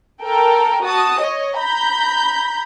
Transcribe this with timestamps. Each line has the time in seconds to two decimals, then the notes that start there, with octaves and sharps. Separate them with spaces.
0.22 A4 A#4 G5
0.83 F#4 A5 D#6
1.21 C#5 D#5
1.57 A#5 B5 G6